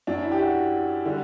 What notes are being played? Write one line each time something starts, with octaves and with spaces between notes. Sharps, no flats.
F#2 F#3 D4
E4
G4
F#4
D3 G3